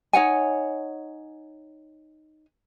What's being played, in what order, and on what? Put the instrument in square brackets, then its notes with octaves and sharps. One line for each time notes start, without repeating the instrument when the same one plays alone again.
[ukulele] D#4 C#5 F#5 G#5